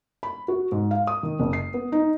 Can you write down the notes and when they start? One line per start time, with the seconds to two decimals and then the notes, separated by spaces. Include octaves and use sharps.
0.23 B5
0.48 F#4
0.72 G#2
0.91 F5
1.07 D#6
1.23 D#3
1.40 F#1
1.53 C7
1.74 B3
1.92 D#4